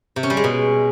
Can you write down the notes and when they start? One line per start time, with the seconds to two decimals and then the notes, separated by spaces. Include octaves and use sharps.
0.16 C3
0.23 C#4
0.30 G3
0.37 G#3
0.44 B2